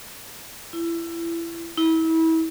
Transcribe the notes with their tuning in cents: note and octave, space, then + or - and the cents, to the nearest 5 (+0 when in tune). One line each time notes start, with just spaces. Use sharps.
E4 +25
E4 -30